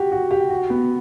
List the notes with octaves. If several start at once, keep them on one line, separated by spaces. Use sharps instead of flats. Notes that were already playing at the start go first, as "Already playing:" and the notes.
Already playing: F#4 G4
F#4
G4
F#4
B3